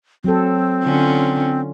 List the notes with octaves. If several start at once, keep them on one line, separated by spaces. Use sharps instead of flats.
F#3 C4 A4
D3 C#4 F4